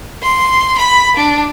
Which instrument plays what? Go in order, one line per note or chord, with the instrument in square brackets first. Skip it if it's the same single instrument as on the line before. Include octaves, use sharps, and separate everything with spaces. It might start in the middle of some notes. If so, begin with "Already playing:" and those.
[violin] C6
B5
D4